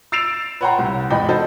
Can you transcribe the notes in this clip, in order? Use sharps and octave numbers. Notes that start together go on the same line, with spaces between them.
E6 A6 C7 D7 E7 F7
B4 C#5 F#5 G5 A#5 C6
C2
E2 G#2 D5 D#5 G5 B5
D#4 F#4 A4 C5